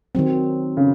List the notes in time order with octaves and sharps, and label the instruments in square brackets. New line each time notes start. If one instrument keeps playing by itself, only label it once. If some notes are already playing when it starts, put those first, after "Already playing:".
[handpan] D#3 F#3 C4
[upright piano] C#3